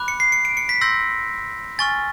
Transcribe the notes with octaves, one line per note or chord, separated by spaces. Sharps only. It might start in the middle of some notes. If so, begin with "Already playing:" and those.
Already playing: B5 D6 F#6
C#7
C7
C#7
D7
C#7
B6
C6 E6 G6 A#6
G#5 C#6 F6 A6